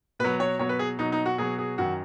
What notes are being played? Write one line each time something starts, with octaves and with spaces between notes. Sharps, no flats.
B2 F#3 B4
C#5
B2 F#3 C#5
B4
G#4
B2 F#3 D#4
D#4
F#4
B2 F#3 G#4
G#4
F#2 D#3 F#3 F#4